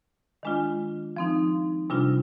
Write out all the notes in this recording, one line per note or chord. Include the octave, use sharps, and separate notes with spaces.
D#3 G#3 D4 F4
F3 C4 D#4
C3 G3 D4 F4